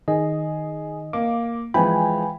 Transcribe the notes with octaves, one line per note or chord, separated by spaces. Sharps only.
D#3 G#4 D#5
A#3 D6
E3 F3 G#3 G5 G#5 B5